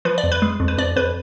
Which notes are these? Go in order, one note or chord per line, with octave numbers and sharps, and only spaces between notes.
F3 B4
D5
F2
B4
G#3
F2
B4
F2 D5
F2 B4